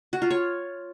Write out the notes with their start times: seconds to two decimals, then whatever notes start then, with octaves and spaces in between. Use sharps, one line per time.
0.13 F#4
0.22 F4
0.30 C#5